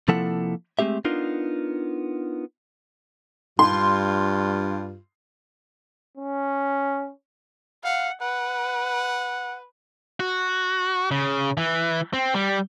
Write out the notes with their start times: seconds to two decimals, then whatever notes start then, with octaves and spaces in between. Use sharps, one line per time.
0.08 C3 F3 A#3 E4 A4 F#5
0.79 G#3 A3 C4 G4 E5
1.05 B3 D4 D#4 F4 A#4
3.59 G2 F4 C6
6.17 C#4
7.84 F5 F#5
8.22 B4 F#5
10.20 F#4
11.11 C#3
11.57 E3
12.13 C4
12.35 G3